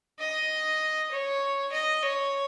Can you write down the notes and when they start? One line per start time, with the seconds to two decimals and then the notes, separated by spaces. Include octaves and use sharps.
0.19 D#5
1.11 C#5
1.72 D#5
2.02 C#5